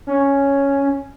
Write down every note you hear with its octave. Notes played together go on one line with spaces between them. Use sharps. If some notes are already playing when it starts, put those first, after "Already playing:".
C#4